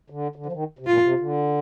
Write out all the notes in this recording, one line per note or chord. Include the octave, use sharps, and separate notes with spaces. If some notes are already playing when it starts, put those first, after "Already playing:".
D3
D3
F3
D#3
C3
A#2 F4
C3
D3